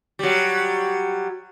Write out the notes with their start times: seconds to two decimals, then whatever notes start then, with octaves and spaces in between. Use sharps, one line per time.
0.19 F#3 G3